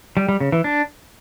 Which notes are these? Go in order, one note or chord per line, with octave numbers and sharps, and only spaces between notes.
G3
G3
C#3
E3
D4